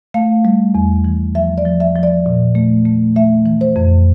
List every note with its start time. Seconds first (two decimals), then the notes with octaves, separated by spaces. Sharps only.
0.14 A3 F5
0.45 G3
0.75 E2
1.04 E3
1.35 F3 E5
1.58 D5
1.65 F3
1.80 E5
1.96 F3
2.03 D5
2.26 A#2
2.55 A3
2.85 A3
3.16 A3 E5
3.46 E3
3.61 C5
3.76 F2